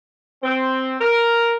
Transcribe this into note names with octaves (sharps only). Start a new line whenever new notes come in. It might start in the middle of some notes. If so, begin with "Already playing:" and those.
C4
A#4